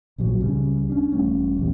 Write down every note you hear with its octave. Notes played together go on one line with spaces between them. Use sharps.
A#1 A#2 F3 F#3
C#2 C#3 G3 C#4
C#4 D4
E1 G3 A3 C#4
A#1 E2 C3 G3